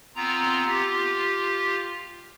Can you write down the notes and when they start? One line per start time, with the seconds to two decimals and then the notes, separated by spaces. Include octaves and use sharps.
0.16 B3 C4 F4 A#5
0.67 F4 G4